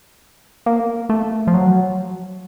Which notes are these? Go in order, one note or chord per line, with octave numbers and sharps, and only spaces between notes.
A#3
A3
F3
F#3